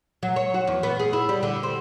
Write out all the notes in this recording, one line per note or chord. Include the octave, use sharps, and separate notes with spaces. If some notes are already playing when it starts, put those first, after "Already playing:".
F#3
C#5
F#4
E2
B3
G#4
E4
G3
D3
C4